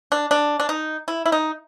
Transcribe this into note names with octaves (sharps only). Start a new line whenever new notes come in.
D4
D4
D4
D#4
E4
E4
D#4